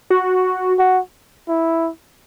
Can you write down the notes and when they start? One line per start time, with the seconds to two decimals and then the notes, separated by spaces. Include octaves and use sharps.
0.10 F#4
0.79 F#4
1.48 E4